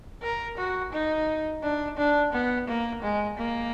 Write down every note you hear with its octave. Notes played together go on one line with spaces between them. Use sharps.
A#4
F#4
D#4
D4
D4
B3
A#3
G#3
A#3